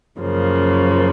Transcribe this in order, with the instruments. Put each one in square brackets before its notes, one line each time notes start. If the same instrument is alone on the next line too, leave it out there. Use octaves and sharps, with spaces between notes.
[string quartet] F#2 C#3 F3 A#3